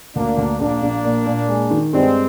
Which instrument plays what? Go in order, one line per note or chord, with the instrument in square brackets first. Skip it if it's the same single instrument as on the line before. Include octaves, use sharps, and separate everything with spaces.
[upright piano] D2 [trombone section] A#3 D4
[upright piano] D2
[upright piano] A#1 [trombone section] A#3 D4
[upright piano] A#1
A#2
A#2
G#3
D#3
[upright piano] G2 [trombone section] G#3 C4